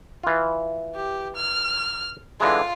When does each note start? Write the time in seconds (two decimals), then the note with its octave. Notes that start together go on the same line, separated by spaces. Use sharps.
0.23 E3 F4
0.95 G4
1.36 F6
2.40 D3 E3 G#3 F4